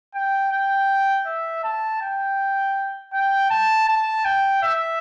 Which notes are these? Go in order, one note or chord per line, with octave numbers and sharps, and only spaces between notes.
G5
G5
E5
A5
G5
G5
A5
A5
G5
E5